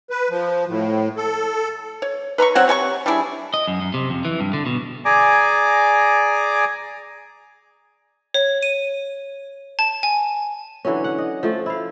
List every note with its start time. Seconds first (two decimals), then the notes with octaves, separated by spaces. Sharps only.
0.10 B4
0.30 F3
0.68 A2
1.17 A4
2.02 C#5
2.38 B4 A#5 B5 C#6
2.55 F#3 C4 C#5 F#5
2.68 G4 C#5 G#5 C#6
3.06 G3 D4 E4 G#4
3.54 D#5
3.68 F#2
3.82 F#2
3.94 C3
4.10 F2
4.25 E3
4.40 G2
4.53 D3
4.66 B2
5.05 G#4 D5 G#5 A#5 D6
8.34 C#5
8.63 D#7
9.79 A5
10.03 G#5
10.85 D3 E3 F#3 C#4
11.04 F#5
11.18 D#5
11.43 F3 A3
11.66 E4 F5